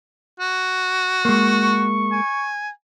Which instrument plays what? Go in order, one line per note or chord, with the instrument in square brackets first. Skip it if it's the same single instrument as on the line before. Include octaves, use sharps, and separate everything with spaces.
[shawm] F#4
[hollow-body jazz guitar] G#3 A#3 [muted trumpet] C#6
[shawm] G#5